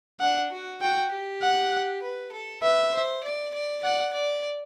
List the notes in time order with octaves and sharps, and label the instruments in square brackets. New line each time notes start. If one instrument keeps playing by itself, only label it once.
[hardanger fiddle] D4 [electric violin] F#5
[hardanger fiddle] F#4
[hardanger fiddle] F#4 [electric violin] G5
[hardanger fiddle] G4
[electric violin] F#5
[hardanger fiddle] B4
A4
[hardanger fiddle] B4 [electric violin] E5
[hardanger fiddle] C5
D5
D5
[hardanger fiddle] D5 [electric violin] F#5
[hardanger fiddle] D5